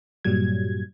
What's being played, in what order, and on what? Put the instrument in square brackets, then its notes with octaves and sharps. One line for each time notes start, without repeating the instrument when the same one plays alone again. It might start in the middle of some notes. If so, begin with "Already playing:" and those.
[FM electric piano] G2 A#2 F#3 G3 G#6